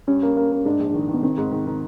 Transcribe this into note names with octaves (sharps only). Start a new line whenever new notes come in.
G2 C#4
A#3
A#3
A#3
G#2 D4
A#1
D#3
D#3
B3
D#3 C4
G#2
D#3
D#3